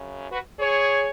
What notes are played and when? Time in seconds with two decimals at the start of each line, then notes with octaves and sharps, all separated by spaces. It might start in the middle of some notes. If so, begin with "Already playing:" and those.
Already playing: F#2 C#3
0.31 F#4 B4
0.60 G#4 C#5